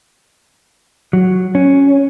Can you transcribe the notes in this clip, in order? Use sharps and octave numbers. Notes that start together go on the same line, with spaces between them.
F#3
C#4